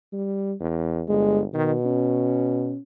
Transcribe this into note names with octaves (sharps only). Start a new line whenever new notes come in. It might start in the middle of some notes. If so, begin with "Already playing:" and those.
G3
E2
G1 G#3
B2 D#3
C#4